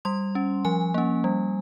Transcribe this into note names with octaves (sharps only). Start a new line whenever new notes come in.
G3 C6
C#4
F3 G#5
A#3 C#4
G3